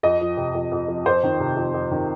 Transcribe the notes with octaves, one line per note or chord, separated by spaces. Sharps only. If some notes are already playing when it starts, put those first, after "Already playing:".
F2 D#5
F3
C3
F2
F2
F3
F2 C5
D#3
C3
F2
F2
D#3